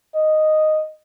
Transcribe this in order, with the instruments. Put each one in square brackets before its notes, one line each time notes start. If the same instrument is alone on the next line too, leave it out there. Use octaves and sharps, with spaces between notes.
[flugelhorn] D#5